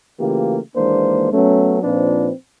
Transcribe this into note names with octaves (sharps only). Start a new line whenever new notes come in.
C#3 E3 A3 A#3 F4 G4
D#2 E3 G#3 A#3 D4 C5
F#3 A3 B3 C#4
A#2 F3 C4 D4 D#4 B4